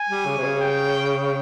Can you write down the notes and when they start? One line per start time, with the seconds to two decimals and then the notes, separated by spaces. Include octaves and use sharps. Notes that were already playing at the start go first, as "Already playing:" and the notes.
Already playing: G#5
0.09 G3
0.26 C#3
0.37 C3
0.44 C#3
0.60 G5